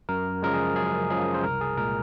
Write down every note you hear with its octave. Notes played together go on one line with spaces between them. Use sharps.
F#2 A#4
C#3 F3 G#3 A#4
G#4
F#2 G#4
C#3 F3 G#3 G#4
C5
C2 A#4
G#4
A#2 G#3 A#4